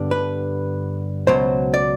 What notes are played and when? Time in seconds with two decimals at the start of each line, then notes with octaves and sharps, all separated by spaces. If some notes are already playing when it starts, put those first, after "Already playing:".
Already playing: G2 D3 G3 B3 D4
0.11 B4
1.27 C#2 B2 F#3 C5
1.74 D5